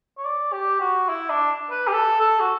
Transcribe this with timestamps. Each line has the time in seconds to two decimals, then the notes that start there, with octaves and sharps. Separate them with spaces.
0.18 C#5
0.25 D5
0.53 G4
0.80 F#4
1.09 E4
1.30 D4
1.71 B4
1.88 G4
1.93 A4
2.20 A4
2.40 F#4